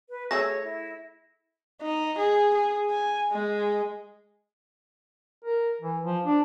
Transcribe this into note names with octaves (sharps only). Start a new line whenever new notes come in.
B4
A3 G#4 C#5 E5 A#6
E4
D#4
G#4
G#4
G#5
G#3
A#4
E3
F3
D4